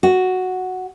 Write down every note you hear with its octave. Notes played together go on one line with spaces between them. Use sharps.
F#4